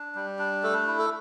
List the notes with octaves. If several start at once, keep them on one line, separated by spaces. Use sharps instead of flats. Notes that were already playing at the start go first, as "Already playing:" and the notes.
Already playing: D4
G3
D4
A3 A4
E4
A4